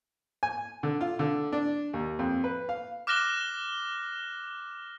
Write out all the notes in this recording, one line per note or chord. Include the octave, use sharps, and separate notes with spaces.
G#5
D3
F4
D3
D4
D#2
F2
B4
F5
D6 F6 F#6 A#6 E7 G7